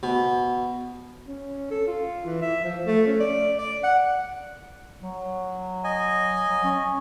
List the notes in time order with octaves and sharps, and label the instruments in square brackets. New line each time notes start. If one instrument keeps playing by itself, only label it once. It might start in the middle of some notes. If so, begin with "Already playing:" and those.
[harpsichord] B2
[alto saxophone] C#4
A4
F4
E3
E5
F3
A3
C#4
D5
D5
F#5
[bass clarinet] F#3
[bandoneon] D#5 G#5
[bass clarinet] F#3
C#4